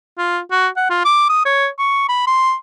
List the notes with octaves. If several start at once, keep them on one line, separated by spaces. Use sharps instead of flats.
F4
F#4
F#5
F4
D6
D#6
C#5
C#6
B5
C6